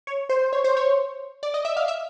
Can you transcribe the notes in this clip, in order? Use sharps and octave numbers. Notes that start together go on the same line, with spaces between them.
C#5
C5
C#5
C5
C#5
D5
D#5
E5
F5
E5